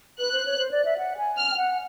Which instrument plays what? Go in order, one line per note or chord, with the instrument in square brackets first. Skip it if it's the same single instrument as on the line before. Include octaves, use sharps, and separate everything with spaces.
[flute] B4 [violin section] F#6
[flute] C5
C#5
C5
D5
E5
F#5
G#5
[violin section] F6
[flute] G5
F#5